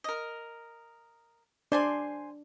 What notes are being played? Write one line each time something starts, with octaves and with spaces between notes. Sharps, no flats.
A#4 D#5
D4 C5 D5 G#5 C6